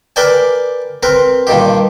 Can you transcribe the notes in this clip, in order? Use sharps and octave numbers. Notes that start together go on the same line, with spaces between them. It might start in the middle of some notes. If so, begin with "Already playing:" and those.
A#4 B4 D5 G5 G#5
C4 A#4 B4
G2 A#2 D#3 G4